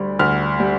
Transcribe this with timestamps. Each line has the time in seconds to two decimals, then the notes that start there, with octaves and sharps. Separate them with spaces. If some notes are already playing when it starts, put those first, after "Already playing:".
Already playing: D2 G3
0.19 D2 F6
0.60 G3